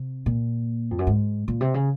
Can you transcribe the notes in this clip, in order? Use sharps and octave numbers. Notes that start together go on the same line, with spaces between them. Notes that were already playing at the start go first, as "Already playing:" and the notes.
Already playing: C3
A#2
F2
F#2
G#2
A#2
C3
C#3